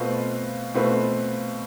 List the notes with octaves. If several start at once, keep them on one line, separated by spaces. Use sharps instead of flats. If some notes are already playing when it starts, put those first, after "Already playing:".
Already playing: B2 A3 C4 F4 B4
B2 A3 C4 F4 B4